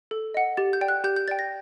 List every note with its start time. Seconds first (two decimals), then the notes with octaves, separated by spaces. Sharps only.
0.11 A4
0.34 D#5 F#5
0.57 G4 A6
0.73 G6
0.81 D5 G5
0.88 F#6
1.04 G4 G6
1.16 G6
1.28 D5 G5 A6
1.39 A#6